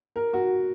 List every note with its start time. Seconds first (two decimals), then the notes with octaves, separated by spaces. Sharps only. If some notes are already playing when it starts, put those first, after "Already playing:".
0.16 A#4
0.33 F#4